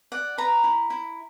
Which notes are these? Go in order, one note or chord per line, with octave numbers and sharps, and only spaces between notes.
D5 F#5
B4 A#5
E4
E4